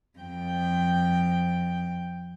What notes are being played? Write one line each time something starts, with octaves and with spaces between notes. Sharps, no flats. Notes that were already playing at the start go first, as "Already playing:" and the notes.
F2 G5